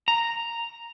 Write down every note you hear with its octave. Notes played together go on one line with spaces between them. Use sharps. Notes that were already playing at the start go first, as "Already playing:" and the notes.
A#5